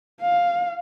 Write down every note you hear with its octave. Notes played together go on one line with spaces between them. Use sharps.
F5